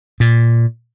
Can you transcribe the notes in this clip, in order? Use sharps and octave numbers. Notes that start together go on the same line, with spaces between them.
A#2